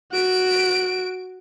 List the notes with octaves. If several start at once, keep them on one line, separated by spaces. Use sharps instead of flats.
F#4 D7